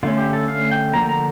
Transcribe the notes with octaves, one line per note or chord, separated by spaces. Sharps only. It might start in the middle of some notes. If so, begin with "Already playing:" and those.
D3 A3 C#4 F4
G4
A4
F5
G5
D3 F3 A#3 A#5
A#5